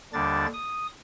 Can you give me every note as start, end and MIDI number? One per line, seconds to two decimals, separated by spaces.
0.13 0.46 39
0.13 0.46 50
0.13 0.46 55
0.13 0.46 62
0.13 0.46 93
0.53 0.87 87